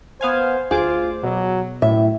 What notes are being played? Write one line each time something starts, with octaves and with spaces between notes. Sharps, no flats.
B3 C5 F5 G#5
D2 F4 G#4 C5 D6
B2 F#3
F#2 A2 E5